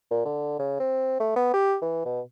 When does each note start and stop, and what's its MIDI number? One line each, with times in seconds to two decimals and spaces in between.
0.11 0.23 46
0.25 0.58 50
0.59 0.78 49
0.80 1.19 60
1.20 1.34 57
1.36 1.52 59
1.54 1.76 67
1.82 2.01 52
2.05 2.20 47